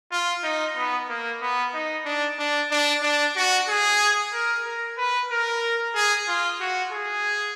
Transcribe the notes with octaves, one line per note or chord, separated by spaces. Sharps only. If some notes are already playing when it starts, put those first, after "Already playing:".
F4
D#4
B3
A#3
B3
D#4
D4
D4
D4
D4
F#4
G#4
A#4
A#4
B4
A#4
G#4
F4
F#4
G#4